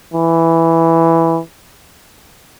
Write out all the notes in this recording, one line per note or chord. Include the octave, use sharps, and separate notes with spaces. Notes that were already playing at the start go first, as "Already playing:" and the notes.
E3